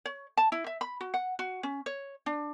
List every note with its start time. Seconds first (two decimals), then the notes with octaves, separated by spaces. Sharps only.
0.05 C#5
0.37 A5
0.52 E4
0.67 E5
0.81 B5
1.01 F#4
1.14 F#5
1.39 F#4
1.63 C#4
1.86 C#5
2.26 D4